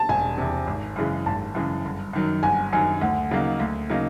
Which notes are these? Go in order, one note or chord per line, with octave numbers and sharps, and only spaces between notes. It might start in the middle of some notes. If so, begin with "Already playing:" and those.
Already playing: A5
E1 G#5
E2 C3
G#1
F#2 C#3 E3 G#3
G#1 A5
F#2 C#3 E3 G#3
G1
F#2 D#3 F#3
G1 G#5
F#2 D#3 F#3 G#5
D2 F#5
C#3 F#3 A#3 D#4
D2
C#3 F#3 A#3 D#4